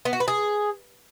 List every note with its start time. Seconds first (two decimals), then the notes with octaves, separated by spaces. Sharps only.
0.05 B3
0.13 F#4
0.20 B4
0.28 G#4